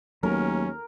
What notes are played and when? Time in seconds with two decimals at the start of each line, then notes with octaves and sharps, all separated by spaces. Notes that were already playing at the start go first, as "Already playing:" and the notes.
0.23 D#2 F#3 A3 B3 C#4 A#4